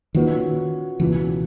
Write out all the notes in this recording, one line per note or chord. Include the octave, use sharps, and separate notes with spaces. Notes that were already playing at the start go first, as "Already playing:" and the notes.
A#2 D#3 A#3 C#4 F#4 B4
C#2 B2 E3 A#3